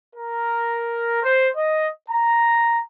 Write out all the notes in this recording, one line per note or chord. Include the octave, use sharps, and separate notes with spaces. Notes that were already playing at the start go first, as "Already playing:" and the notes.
A#4
C5
D#5
A#5